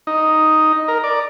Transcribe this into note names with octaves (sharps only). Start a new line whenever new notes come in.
D#4
A#4
D5